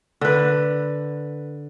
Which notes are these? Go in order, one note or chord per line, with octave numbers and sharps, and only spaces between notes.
D3 B4